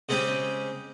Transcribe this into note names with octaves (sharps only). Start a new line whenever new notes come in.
C#3 G#3 C4 C#4 G4